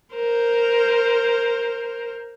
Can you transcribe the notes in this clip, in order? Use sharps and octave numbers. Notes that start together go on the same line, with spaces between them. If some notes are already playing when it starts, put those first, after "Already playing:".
A#4 C5